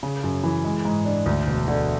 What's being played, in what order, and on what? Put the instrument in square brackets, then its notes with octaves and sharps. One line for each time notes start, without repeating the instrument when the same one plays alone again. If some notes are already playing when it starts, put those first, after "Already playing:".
[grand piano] C#3
F#2
E3
G#3
G#2
D4
D2
E1
D3